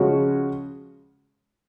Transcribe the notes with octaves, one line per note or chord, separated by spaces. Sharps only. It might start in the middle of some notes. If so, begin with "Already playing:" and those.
Already playing: C#3 F3 G#3 C#4 F#4